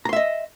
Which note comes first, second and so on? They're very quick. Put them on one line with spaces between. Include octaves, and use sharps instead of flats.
A#5 C6 E5 D#5